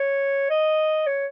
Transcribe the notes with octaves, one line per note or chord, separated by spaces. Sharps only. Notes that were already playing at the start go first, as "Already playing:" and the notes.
Already playing: C#5
D#5
C#5